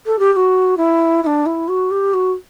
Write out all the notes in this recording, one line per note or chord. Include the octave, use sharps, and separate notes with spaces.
A4
G4
G4
F#4
E4
E4
D4
E4
F#4
G4
F#4